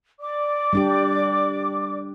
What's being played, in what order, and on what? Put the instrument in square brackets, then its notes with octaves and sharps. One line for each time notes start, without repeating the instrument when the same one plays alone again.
[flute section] D5 D6
[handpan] G3 D4 G4